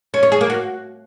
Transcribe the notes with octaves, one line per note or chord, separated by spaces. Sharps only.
C#4
C#5
G#4
A#3
F#4